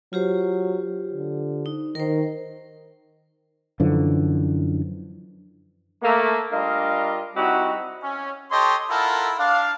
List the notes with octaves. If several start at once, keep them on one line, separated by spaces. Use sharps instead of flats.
F#3 F4 G4 C5
D3
D#4
D#3 A#4 C5
F#2 D3 E3 F3
A3 A#3
G3 D4 F4 A#4 D#5 F5
G3 C4 D#4 E4 F#4
C#4
G4 A4 C#5 D#5 C6
E4 F4 A4 A#4 F#5 B5
D4 F5